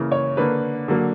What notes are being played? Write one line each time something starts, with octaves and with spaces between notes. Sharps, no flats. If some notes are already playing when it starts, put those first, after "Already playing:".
Already playing: C#3 E3 A#3
C#5
D3 A#3 B4
D3 F#3 A#3